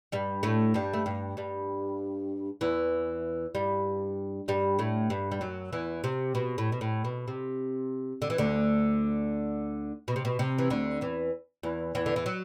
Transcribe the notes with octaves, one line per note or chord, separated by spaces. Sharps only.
G2 G3
A2 A3
G2 G3
A3
G2 G3
G2 G3
E2 E3
G2 G3
G2 G3
A2 A3
G2 G3
G3
F#2 F#3
E2 E3
C3
B2
A2
B2
A2
B2
C3
D3
E3
D2 D3
B2
C3
B2
C3
E3
D2 D3
E2 E3
E2 E3
E2 E3
D3
E3
F#3